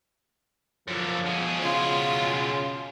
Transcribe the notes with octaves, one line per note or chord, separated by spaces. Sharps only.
F#2 D3 F3
B2 G#4
C#3 F4